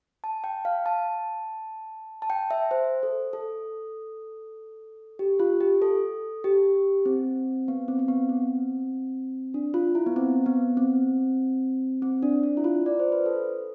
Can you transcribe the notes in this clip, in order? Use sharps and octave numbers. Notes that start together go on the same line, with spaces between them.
A5
G5
F5
A5
A5
G5
E5
C5
A4
A4
G4
F4
G4
A4
G4
C4
B3
C4
C4
B3
C4
D4
F4
E4
B3
C4
B3
C4
C4
D4
D4
E4
F4
D5
C5
B4
A4